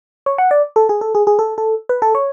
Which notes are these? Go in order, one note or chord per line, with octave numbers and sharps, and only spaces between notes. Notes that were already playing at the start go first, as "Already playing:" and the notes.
C#5
F#5
D5
A4
G#4
A4
G#4
G#4
A4
A4
B4
A4
C#5